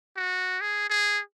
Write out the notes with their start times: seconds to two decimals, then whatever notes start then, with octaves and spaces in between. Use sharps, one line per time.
0.16 F#4
0.61 G#4
0.90 G#4